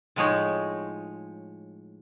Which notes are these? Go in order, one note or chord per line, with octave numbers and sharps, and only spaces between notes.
A2 F3 G#3 D#4 C#5